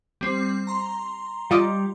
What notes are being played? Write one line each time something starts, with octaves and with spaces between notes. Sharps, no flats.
G3 C4
A#5 C6
G3 F4 D5 D#5 D6